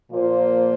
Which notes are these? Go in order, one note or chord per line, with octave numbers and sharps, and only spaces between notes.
A#2 F3 A#3 F4 C5